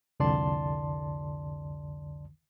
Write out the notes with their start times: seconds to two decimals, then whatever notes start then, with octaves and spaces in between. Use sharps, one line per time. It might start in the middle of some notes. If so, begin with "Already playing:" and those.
0.20 C2 F2 D3 D5 A5 C6